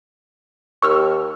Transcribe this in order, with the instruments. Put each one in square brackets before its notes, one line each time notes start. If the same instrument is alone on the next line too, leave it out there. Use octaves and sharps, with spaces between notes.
[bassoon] D#2 [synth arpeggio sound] C#6 E6 F6